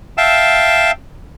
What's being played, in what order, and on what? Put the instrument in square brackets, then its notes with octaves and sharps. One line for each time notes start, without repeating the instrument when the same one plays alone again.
[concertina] E5 F5 G5 A5 E6